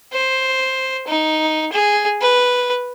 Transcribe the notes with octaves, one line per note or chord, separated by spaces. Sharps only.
C5
D#4
G#4
B4